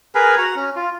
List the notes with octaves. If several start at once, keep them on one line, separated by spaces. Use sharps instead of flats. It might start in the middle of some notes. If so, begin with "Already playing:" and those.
G#4 A#4 B4 G#5
F#4 F#5 A#5
C#4
F4